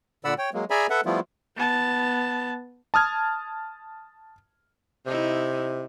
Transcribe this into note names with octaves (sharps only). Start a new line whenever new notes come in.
A#2 D3 D5 F#5 B5 E6
C#5 G5
F#3 G#3 A#3
G#4 D5 E5 G#5 A#5 B5
A4 B4 E5 F#5
F3 G3 A3 B3 E4 F4
B3 A5
A5 D#6 F6 G#6
C3 D#4 E4